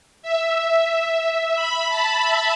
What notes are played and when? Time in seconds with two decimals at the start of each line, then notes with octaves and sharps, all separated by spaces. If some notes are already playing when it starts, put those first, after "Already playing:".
0.23 E5
1.56 B5
1.89 A5
2.22 E5